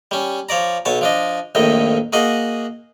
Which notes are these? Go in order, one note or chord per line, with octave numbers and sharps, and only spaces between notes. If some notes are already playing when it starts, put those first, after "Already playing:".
G3 C#4
F3 C#5 D5 A#5
B1 B2 C#5 A5
F3 D4 D#5
A#1 F2 A2 D#3 D#5
A#3 F#4 G#4 D#5 F#5